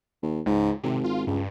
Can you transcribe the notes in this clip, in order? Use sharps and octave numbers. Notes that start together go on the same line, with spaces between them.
D#2
C#2 G#2
G#1 C3
F4
C#2 G2